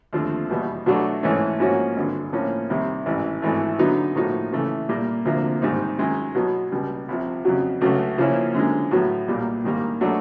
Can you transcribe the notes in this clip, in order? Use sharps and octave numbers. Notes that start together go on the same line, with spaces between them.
D#2 D3 F3 A3 C4
E2 B2 G3 B3
B2 F#3 A3 D4 F#4
G#2 E3 A3 C#4
G#2 F3 A#3 C#4 F#4
G#1 G2 D3
A2 F3 A#3 C#4
C2 C3 D#3 G3
A1 G#2 E3
G#1 G#2 E3 A3
D3 F#3 B3 D#4
A2 F3 A#3 D#4 F#4
C#3 E3 A3
A#2 G3 A#3
D2 C3 F3 A#3
G#2 D#3 G3 C4 D#4
F#2 D#3 G#3
B2 F#3 B3
C#2 B2 G3
C2 C3 F3
F2 C#3 F#3
C#2 C#3 F#3 A3
C#3 F3 A#3 C#4 E4
F#2 D3 F3 G#3
A2 F#3 B3
B1 A#2 G3 A#3
G#2 D#3 G3 A#3
B2 F#3 A3 D4 F#4